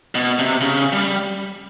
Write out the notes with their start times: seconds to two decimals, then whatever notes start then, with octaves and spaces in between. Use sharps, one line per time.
0.15 B2
0.39 C3
0.61 C#3
0.92 G3